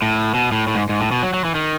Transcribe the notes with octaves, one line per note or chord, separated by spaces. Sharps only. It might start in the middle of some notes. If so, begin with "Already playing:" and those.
A2
B2
A2
A2
G#2
G#2
A2
B2
F#3
F#3
E3
D#3